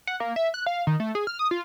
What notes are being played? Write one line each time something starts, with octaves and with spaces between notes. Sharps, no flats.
F#5
A#3
E5
F#6
F5
D#3
A3
G#4
F6
D#6
F4